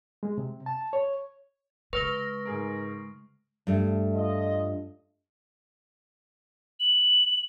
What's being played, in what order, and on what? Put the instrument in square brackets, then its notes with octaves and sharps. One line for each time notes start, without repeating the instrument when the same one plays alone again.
[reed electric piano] G#3
C3
A5
C#5
[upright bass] C#3 G#3 [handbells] B4 [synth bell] C#6 F6 A#6
[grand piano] G#2 G#4 A#4
[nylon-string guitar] G2 A3
[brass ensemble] F4 D#5
[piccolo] F#7